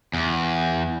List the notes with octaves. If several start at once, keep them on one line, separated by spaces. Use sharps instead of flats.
E2